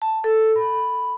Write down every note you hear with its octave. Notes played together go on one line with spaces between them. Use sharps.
A5
A4
B5